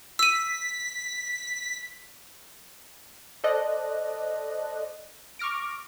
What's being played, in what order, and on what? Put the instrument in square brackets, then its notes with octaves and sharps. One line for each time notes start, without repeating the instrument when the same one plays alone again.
[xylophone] E6 D#7 [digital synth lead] B6
[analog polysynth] A4 C5 D5 D#5 F#6
C#6 D6 F6 A#6 D7